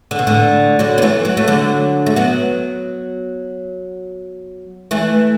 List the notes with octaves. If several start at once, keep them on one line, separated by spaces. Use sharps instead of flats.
D3
B2
A2 D3
D3 F#3
B3
E3 A3
F#3
A3
D3 F#3
A3
F#3 B3
E3 A3